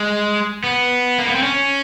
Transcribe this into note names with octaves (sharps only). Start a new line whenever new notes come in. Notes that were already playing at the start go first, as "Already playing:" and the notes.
Already playing: G#3
B3
A#3
B3
C4
C#4